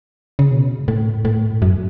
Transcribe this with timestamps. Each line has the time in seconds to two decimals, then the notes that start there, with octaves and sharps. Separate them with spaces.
0.39 C#3
0.51 B2
0.79 G#2
0.88 A2
1.25 A2
1.62 F#2